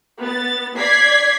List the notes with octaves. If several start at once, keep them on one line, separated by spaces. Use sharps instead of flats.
B3 A6
D5 G#6 B6 C7